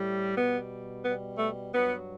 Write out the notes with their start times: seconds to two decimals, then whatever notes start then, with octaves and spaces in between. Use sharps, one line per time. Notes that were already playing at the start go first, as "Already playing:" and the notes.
Already playing: A2 G3
0.37 B2 G3 B3
1.05 B2 G3 B3
1.39 A3
1.73 G2 F#3 B3